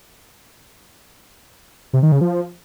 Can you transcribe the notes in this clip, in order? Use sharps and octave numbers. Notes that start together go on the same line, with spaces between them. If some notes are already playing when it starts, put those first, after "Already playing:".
C3
D#3
C#3
F3